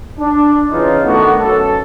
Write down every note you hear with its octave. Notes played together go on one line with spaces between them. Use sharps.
D4
C#3 E3 D#4 F4
D#3 A3 B3 D4 F#4
B1 F#2 A4